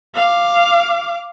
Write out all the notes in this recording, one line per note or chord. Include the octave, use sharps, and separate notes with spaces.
F5 D6